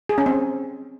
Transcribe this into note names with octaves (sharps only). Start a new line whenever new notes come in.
G#4
C#4
C4